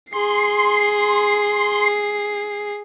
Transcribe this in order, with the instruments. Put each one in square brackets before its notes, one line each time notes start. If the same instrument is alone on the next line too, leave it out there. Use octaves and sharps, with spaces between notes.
[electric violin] G#4 C7 [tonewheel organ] C6